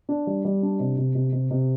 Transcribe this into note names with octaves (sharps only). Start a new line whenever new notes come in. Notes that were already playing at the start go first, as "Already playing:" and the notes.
D4
G3
G3
D4
C3
C3
C3
C3
C3